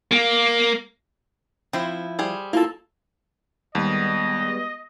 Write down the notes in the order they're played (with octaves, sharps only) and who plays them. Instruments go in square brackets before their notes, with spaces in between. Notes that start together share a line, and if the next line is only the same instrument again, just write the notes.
[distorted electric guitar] A#3
[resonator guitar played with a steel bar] F3 E4 [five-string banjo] C4
[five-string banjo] G3 G#4 C5
[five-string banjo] A#3 A4 [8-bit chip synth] E4 F4 A5
[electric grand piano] D#2 [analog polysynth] G3 G#3 B3 [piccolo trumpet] D#5